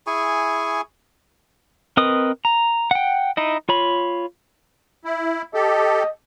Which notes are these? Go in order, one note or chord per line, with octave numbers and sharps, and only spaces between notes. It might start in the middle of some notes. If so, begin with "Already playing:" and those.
E4 G#4 G#5 C#6
C4 A#4 B4 D#5 D#6
A#5
F#5 G5
D#4 E4 D#5
F4 C#5 B5
E4
G4 A4 D#5